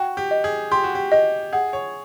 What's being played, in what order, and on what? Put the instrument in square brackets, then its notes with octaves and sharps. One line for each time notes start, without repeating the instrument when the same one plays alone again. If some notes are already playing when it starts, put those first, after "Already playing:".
Already playing: [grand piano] F#4 [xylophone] G5
[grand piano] G4
[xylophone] D#5
[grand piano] G#4
[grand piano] G4 [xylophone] C6
[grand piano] F#4
G4
[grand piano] G4 [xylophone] D#5
[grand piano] G#4 [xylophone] F#5
[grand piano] C#5